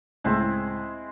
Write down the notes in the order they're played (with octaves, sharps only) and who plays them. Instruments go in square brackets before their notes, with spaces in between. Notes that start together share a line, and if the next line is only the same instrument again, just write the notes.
[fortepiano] C#2 A2 [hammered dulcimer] G#3 C4 E4